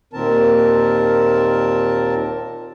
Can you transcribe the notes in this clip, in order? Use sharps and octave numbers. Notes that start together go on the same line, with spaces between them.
D#2 A#2 D#3 C4 A#4 A5